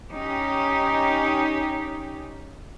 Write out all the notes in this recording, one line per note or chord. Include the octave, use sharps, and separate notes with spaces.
C#4 D#4 G4